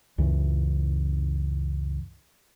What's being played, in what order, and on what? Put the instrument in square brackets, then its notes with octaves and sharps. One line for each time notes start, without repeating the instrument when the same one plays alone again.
[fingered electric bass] C#2 F#2 C#3 E3